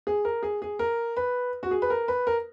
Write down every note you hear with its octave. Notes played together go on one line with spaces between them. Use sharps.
G#4
A#4
G#4
G#4
A#4
B4
F#4
G#4
B4
A#4
B4
A#4